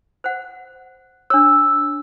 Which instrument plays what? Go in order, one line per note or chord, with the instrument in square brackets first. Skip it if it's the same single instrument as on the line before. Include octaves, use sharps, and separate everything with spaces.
[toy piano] C5 F#5
[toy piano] D4 C#5 [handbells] E6